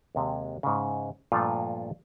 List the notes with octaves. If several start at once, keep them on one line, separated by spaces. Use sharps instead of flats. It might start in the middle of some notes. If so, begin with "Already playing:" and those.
D#2 C3 G#3
G#2 C#3
G2 A#2 F3 A3 F4 A4